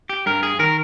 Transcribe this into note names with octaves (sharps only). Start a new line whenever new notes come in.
G4
G2 A#4
G#4
D#3 A#4